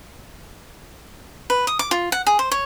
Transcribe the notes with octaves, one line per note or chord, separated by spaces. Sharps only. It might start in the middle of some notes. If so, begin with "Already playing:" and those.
B4
D#6
D6
F4
F#5
G#4
C5
C#5